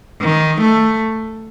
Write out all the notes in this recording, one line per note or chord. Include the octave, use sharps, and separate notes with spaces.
D#3
A3